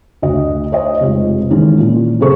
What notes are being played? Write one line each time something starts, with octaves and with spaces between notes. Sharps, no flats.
D2 F#4 D#5
C5 C#5 D#5
F1 G#3 F4
D#3 E3 G#3 C#4
A#2
F#2 C3 G#4 A4 C5 C#6